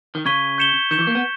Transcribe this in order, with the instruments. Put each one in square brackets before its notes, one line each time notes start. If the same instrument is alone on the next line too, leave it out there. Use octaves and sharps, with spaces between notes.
[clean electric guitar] D#3
[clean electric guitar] C#3 [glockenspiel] C#6 G#6 B6 D#7 G7
[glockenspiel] G6 C#7 E7 G7
[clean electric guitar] D#3 [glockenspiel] G6 C#7 E7 G7
[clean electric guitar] E3
A#3
B3